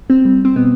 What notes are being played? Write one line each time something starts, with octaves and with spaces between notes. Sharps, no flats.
C4
G3
C4
B2 B3